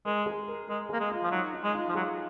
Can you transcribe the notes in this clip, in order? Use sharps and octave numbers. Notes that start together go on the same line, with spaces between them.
G#3 A#4
G#4
A#4
G#3 A#4
A#3 G#4
G#3
F4
F3
F#3 D#4
D#4
G#3
F4
F3
F#3 G#4